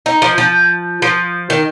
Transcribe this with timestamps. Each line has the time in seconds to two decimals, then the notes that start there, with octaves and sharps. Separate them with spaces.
0.06 D#4
0.22 F3
0.38 F3
1.02 F3
1.50 D#3